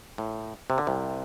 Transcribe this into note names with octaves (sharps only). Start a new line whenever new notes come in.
A2
C3
D3
C2 C3